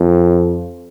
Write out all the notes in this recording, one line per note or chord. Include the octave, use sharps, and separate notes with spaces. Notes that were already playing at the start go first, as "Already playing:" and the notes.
Already playing: F2